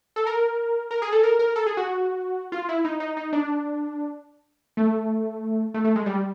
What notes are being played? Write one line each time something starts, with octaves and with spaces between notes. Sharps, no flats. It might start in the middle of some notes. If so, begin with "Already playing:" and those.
A4
A#4
A#4
G#4
A4
A#4
A#4
A4
G#4
F#4
F4
E4
D#4
D#4
D#4
D4
A3
A3
A3
G#3
G3